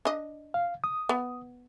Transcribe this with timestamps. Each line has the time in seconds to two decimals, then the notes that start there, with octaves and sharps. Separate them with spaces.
0.05 D4 D#5
0.54 F5
0.84 D#6
1.09 B3